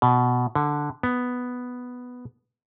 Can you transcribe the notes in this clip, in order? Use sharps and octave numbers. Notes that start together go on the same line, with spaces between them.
B2
D3
B3